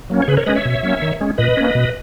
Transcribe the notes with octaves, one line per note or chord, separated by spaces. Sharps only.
F#3 A#3 C#4
C#5
C#3 G#4 B4
A#4 C#5
G#3 C#4 B4 D#5
C#5 E5
B2
F#3 A#3 C#4
D#3
G#3 C#4
A#2 B4 D#5
A#3 C#4
B2